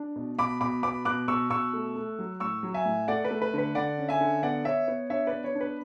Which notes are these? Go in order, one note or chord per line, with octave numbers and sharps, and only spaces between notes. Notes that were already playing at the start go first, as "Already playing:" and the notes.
Already playing: D4
B2
B2 B5 D6
B2 B5 D6
B3 B5 D6
B2 D6 F#6
B2 C#6 E6
B2 C#6 E6
A3
A3
F#3
A2 C#6 E6
F#3
E5 G#5
A2
A3 D5 F#5
B4
A3
B4
D3
B4
D3 D5 F#5
C#4
E5 G#5
D3
B3 D5 F#5
B3 C#5 E5
B3 C#5
D4 C#5 E5
B4 D5
B3
C#5
D4
B4